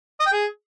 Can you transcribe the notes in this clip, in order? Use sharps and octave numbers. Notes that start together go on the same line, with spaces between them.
D#5
G5
G#4